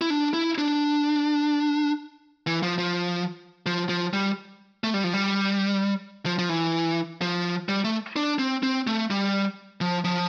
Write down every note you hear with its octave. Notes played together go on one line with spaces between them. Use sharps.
E4
D4
E4
D4
E3
F3
F3
F3
F3
G3
A3
G3
F3
G3
F3
F3
E3
F3
G3
A3
D4
C4
C4
A3
G3
F3
F3